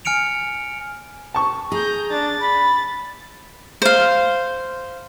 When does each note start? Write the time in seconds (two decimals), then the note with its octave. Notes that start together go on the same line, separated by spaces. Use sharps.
0.05 G#5 F6 C#7 D7 F7
1.34 A5 C#6
1.72 G#4 A#5 G6
2.11 D4 A6
2.41 B5
3.82 C5 F5